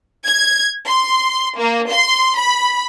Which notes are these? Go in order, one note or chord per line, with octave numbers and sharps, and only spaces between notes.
G#6
C6
A#3
C6
B5